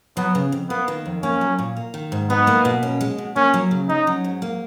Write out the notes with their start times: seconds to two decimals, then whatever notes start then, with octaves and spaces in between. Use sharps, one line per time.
0.17 F#3 B3
0.35 C#3
0.52 F2
0.70 A#3 B3
0.88 D#3
1.06 F2
1.23 A#3 C#4
1.41 F#3
1.59 A#2
1.77 A#3
1.94 D#3
2.12 G#2
2.30 B3 D#4
2.47 A#3
2.65 B2
2.83 C#4
3.01 G#3
3.18 B2
3.36 A#3 C#4
3.54 F#3
3.71 C#3
3.89 C#4 D#4
4.07 F#3
4.24 G#2
4.42 A#3